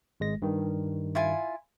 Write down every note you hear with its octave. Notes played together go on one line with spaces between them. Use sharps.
G#1 G#3 A#6
G2 D#3
E4 F4 G#5